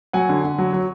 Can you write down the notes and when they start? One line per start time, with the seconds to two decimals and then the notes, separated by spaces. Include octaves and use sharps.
0.13 F#3 F#5 G#5
0.29 D3
0.44 D3
0.58 F#3
0.73 F#3